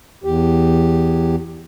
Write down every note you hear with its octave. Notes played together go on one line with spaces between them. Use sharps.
E2 G4